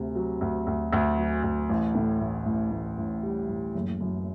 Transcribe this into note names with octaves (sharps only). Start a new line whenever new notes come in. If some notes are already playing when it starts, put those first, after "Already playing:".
Already playing: D2 C3
F#3
D2
D2
D2
F#3
D2
A1
A2
A1
A1
A1
A1
G3
A1
F#1
F#2